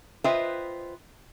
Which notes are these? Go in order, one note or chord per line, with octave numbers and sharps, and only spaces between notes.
F4 B4 C5 D#5 E5 G5